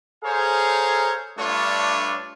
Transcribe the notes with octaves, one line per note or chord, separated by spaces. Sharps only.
G#4 A4 C5 C#5 F5 A#5
G2 A3 D4 F4 A4 C#5